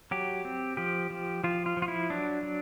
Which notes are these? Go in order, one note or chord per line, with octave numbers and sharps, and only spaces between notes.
F#3 G4
C4
F3 G4
F3
F3 F4
F4
F3
F4
E4
F#3 D4
F#3